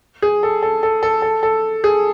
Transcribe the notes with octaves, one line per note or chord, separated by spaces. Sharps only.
G#4
A4
A4
A4
A4
A4
A4
G#4